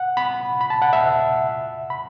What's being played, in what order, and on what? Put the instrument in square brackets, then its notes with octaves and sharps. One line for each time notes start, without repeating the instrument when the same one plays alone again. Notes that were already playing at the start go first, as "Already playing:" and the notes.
Already playing: [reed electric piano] F#5
B5
B5
A5
F#5
E5
B5